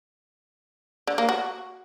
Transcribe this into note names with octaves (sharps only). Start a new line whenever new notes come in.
D3
A#3
F#4